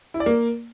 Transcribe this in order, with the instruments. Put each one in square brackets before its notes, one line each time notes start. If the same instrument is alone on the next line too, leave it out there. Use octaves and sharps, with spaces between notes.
[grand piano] E4
D5
A#3